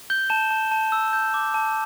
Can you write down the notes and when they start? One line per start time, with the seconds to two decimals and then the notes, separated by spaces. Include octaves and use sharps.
0.10 G6 G7
0.30 A5 E7
0.51 A5
0.71 A5
0.92 E6
1.13 G6
1.34 D6
1.54 A5